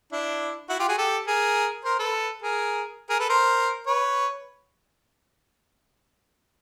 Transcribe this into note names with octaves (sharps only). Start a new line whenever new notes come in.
D4 E4
E4 F#4
F4 G4
F#4 G#4
G4 A4
G#4 A#4
A#4 C5
A4 B4
G#4 A#4
G#4 A#4
A4 B4
A#4 C5
B4 C#5